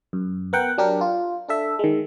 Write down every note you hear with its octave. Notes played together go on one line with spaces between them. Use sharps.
F#2
B3 A#4 F#5 G5
F#3 D4 G4 A#4
F4
D4 A4 E5
D#3 G#3